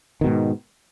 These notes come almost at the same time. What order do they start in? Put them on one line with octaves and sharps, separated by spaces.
D#3 B2 G#2